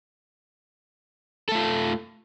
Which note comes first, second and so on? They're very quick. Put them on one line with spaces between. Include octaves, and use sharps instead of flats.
A4 A3 F4